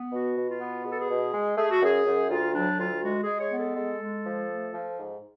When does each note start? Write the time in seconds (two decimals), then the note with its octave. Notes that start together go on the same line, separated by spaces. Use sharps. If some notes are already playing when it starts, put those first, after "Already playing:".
Already playing: B3
0.11 B2 F#4
0.36 B2
0.48 F4
0.60 B3
0.84 B2 G#4
0.91 A4
0.99 G#4
1.09 B2
1.33 G#3
1.57 A3 G#4
1.71 F#4
1.81 F#2 G#4
2.06 F#2
2.30 D2 F4
2.54 F#3 D4
2.78 D2 F4
3.02 G#3 F#4
3.22 G#3 G#4
3.39 C#5
3.52 B3
3.57 A4
3.76 G#3
4.00 G#3
4.24 F3
4.48 A3
4.73 F3
4.97 G#2